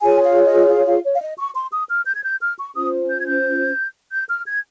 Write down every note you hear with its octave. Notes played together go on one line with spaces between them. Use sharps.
F4 G#4 C#5 G#5
F5
D#5
F5
F5
C#5
F5
D#5
C#6
C6
D#6
F6
G6
G#6
G6
F6
C#6
C#4 F4 C5 D#6
G6
G#6
G6
G6
F6
G#6